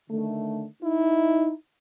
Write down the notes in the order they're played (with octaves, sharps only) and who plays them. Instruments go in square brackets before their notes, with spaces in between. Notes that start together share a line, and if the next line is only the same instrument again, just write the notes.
[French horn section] D3 D#3 A3
[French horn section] D#4 [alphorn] E4